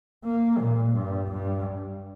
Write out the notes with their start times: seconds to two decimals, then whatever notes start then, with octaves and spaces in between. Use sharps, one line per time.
0.25 A#3
0.60 A#2
0.95 G2
1.31 G2